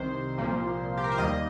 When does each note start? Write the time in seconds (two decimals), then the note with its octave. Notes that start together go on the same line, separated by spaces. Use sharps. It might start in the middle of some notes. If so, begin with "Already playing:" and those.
Already playing: C2 C3 D#3 C5
0.38 C2 A#2 F3 A#3
0.97 G4
1.04 A#4
1.12 C5
1.18 D#2 D#3 G3 A#3 D#5